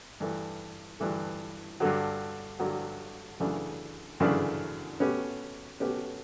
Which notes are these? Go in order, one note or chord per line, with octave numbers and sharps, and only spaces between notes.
G2 E3 A3
G2 E3 A3
G2 D3 F#3
G2 D3 F#3
F#2 C#3 E3 A3 D4
F#2 C#3 E3 A3 D4
B2 A3 C#4 G4 B4
B2 A3 C#4 G4 B4